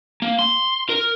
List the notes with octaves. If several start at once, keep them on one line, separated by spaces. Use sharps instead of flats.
A#3
C6
A#4